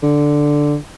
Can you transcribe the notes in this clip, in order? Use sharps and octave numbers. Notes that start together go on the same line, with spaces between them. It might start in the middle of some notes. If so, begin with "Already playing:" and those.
D3